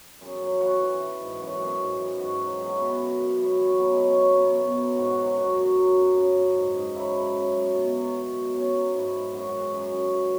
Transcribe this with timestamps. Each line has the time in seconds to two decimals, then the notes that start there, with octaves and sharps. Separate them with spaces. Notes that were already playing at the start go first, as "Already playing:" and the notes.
0.21 F#2 G#4
0.41 F#3
0.61 E3 F#4
0.81 E3
1.00 E3
1.21 G#2
1.40 F#2 F#4
1.60 F#2 G#4
1.80 G#2
1.99 E3
2.19 G#2 F#4
2.40 F#3
2.59 F#3 G#4
2.67 F#4
2.76 B2 E4
2.84 F#4
2.99 F#2
3.19 F#2
3.38 F#2 E4
3.59 E3 C#4
3.78 F#3 B3
3.91 G#3
3.98 F#2
4.05 C#4
4.18 F#3 E4
4.38 B2
4.57 B2 B3
4.77 F#3
4.97 G#2 F#4
5.10 F#4
5.17 F#3
5.23 F#4
5.36 F#2 F#4
5.57 F#2
5.77 F#3
5.96 F#2
6.17 C#3
6.36 F#2
6.56 G#2
6.76 G#2
6.95 F#3 E4
7.15 F#3
7.36 C#3
7.55 F#2
7.75 B2
7.95 F#3
8.15 F#3
8.34 B2
8.54 B2 C#4
8.74 F#3
8.94 G#2 E4
9.14 G#2
9.33 F#2 F#4
9.47 F#4
9.53 E3
9.60 G#4
9.73 F#2
9.93 F#2
10.13 E3